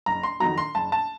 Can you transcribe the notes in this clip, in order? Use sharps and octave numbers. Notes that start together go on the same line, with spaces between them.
F#1 A#5
C6
F2 D#3 F#3 A#5
C6
F#1 A5
A5